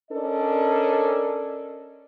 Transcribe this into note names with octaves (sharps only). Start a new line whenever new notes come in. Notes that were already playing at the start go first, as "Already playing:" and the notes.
C#4 D4 A4 A#4 D5 D#5